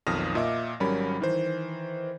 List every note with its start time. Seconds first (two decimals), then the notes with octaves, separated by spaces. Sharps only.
0.07 B1 F2 D#3 D#6 F6 A#6
0.35 A#2 D#5 E5 D6
0.80 G#1 F#3 G3 C#4 A#4 B5
1.20 D#3 E3 C5